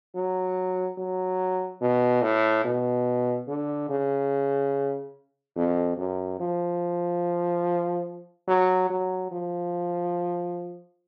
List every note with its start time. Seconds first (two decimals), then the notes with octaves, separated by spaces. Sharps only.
0.15 F#3
0.98 F#3
1.81 B2
2.22 A2
2.65 B2
3.48 D3
3.89 C#3
5.56 F2
5.98 F#2
6.40 F3
8.48 F#3
8.90 F#3
9.32 F3